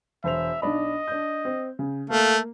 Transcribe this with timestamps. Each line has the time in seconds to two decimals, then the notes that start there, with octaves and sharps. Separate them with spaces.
0.24 E1 C5 E5 F7
0.62 B1 D4 D#5 B5
1.08 D4 G6
1.45 C4
1.79 C#3
2.10 A3 A#3 F5